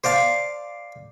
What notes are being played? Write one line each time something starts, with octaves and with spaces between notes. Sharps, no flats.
C5 D5 F5 A5